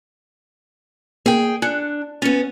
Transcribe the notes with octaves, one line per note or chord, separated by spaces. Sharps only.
A#3 G#4 G5
D4 G#5 F#6 C#7
B3 C#4 A6 C#7